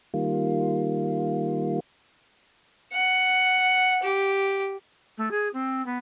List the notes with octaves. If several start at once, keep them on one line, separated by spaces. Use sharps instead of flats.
D#3 G3 A#3 F4
F#5
G4
A3
G#4
C4
B3